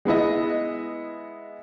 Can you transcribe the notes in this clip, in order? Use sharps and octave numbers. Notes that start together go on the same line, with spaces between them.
G#3 B3 E4 D#5